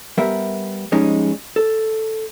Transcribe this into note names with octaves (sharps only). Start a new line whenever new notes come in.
G3 B3 A#4 E5
F3 G3 G#3 C#4 D#4
A4